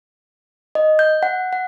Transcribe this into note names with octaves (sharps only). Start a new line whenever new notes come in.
D#5
G6
F#5
F#5